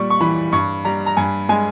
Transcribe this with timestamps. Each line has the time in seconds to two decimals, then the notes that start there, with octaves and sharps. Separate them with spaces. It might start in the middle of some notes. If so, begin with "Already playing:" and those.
Already playing: A#2 G3 C#6
0.10 C#6
0.21 E3 B5
0.52 G2 C#6
0.85 G3 A#5
1.06 A#5
1.17 G2 G#5
1.49 G#3 G#5